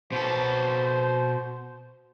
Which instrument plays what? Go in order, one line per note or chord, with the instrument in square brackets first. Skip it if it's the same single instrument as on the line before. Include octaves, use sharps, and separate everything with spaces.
[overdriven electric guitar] B2 A4 [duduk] C5